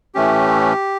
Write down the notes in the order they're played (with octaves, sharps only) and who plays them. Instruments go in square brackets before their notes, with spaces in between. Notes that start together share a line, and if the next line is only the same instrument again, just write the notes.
[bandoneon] A2 E3 A3 C#4 G4